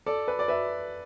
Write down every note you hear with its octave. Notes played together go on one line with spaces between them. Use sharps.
A4 D5
B4
D5
B4 E5